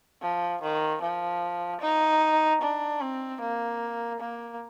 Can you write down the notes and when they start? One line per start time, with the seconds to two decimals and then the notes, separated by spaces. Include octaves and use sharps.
0.21 F3
0.62 D#3
1.02 F3
1.81 D#4
2.61 D4
3.00 C4
3.41 A#3
4.20 A#3